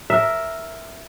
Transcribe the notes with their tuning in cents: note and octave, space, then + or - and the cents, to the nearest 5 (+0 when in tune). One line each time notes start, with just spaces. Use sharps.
A#4 +0 E5 +0